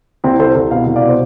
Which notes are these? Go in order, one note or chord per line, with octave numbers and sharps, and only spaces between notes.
C2 C4 E4
C2 A4 C5
C2
B2 F5
C2
D5 F5
B2
C5